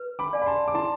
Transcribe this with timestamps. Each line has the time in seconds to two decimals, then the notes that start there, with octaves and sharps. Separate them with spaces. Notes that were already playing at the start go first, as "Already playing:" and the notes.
Already playing: B4
0.19 B5 D6
0.33 D5 F5 G#5
0.42 B5
0.46 A5 C6
0.68 D6
0.74 E4 A5 C6